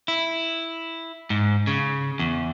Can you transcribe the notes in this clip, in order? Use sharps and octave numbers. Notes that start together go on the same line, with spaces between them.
E4
G#2
C#3
E2